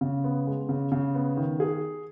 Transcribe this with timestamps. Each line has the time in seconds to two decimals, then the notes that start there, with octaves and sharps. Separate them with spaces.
0.01 C#3
0.24 B3
0.47 G#3
0.69 C#3
0.92 C#3
1.15 B3
1.37 D#3
1.60 G#4